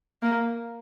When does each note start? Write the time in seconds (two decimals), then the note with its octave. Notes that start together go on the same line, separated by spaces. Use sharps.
0.23 A#3